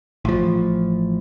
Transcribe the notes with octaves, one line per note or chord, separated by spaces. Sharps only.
A1 F3